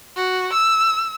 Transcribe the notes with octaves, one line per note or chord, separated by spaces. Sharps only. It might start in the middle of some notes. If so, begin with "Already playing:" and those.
F#4
E6